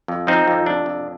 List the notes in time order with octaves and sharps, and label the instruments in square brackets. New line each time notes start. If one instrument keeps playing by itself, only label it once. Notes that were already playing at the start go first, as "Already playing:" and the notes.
[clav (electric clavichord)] F2
F3 C4 D#4
F2
C3 D4
F2